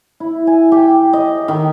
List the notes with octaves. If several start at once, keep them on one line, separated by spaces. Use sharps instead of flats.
E4
G#5
G4
D#5
D#3